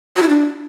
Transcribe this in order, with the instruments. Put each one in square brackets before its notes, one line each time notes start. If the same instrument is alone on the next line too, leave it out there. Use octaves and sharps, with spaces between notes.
[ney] F#4
E4
D4